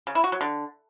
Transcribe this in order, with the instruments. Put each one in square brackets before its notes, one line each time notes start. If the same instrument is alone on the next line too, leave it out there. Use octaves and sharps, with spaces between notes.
[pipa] C#3
E4
F#4
F#3
D3